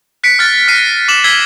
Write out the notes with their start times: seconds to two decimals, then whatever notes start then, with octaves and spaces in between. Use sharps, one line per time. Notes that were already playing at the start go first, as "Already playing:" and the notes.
0.23 F#6 B6 C#7 D7
0.39 F6 F#6 A6
0.68 F6 A#6 C7 D#7
1.08 D6 E7 F#7
1.24 E6 G#6 B6 C7 G7